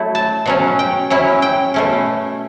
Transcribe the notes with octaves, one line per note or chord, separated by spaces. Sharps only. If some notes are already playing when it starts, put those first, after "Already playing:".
Already playing: F#3 A3 E4
A5
B2 F#3 C#4
G5
F#3 C#4 E4
G5
B2 A3 C#4